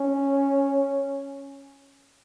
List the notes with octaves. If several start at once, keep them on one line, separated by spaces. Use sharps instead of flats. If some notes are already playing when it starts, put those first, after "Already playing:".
Already playing: C#4